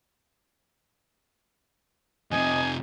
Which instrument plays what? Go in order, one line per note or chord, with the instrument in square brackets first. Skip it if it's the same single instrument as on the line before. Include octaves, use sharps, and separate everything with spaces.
[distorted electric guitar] F2 C3 [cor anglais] D#5 [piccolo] G#5